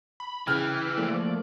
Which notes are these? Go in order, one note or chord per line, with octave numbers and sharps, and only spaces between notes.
B5
C#3 E3 G5 F6
F3 A3 A#3 D5